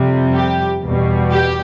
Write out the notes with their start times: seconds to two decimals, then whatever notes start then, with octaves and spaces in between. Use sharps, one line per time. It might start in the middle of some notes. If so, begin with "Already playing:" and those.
Already playing: F2 C3 G3
0.34 G4
0.83 E2 B2 G3
1.32 G4